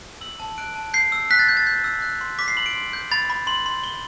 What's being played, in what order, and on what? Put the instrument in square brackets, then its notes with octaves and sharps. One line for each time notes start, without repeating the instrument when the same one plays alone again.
[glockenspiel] E6 F#7
A5
F#6 D7
A5
G6 C7
E6
F#6 B6
A6
F#6 G6
A6
G6
E6
F#6
C6
D6 B6
C7
B5 F#7
D7
C6
G6
B5 A6
B5
C6 F#7
C6
C6 G7